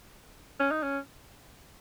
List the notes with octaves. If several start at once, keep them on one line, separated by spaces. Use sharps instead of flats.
C#4
D#4
C#4